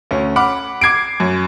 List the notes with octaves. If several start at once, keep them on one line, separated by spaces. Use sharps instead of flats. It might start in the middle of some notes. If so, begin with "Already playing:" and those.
D2 C#4
F#5 B5 D6 F6
D6 G#6 C7 D7
F#2